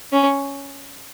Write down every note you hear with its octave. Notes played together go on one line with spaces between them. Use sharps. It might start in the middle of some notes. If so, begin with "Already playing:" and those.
C#4